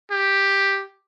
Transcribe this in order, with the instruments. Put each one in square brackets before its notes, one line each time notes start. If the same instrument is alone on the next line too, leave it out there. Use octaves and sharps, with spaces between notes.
[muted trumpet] G4